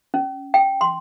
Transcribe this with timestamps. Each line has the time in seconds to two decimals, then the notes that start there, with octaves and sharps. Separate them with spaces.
0.14 C#4
0.54 G5
0.81 C6